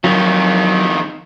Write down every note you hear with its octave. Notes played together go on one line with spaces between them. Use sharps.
F2 D#3 F#3